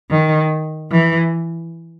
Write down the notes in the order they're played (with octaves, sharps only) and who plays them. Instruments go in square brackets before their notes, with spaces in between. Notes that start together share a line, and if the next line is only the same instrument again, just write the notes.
[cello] D#3
E3